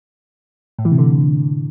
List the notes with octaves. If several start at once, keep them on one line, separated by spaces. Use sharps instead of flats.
A2
E3
C3
D3